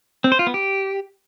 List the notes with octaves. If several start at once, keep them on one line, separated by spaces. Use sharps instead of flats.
C4
C5
F4
B3
G4